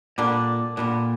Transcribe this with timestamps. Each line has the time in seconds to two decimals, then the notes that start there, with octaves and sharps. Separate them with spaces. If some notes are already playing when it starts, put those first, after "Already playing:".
0.18 A#2 D3 G3 A#3 D4
0.77 A#2 D3 G3 D4